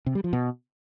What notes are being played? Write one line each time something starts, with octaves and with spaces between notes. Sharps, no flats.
C3
G3
F3
B2